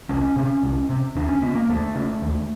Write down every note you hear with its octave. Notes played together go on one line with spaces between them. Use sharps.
C2 C#4
C3
C2
C3
D#2 D4
C#4
C#3 B3
A#3
D#2 A3
C#3
D#2